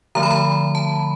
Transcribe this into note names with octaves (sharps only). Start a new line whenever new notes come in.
D3 F3 A3 A#5
B5
A#5
A5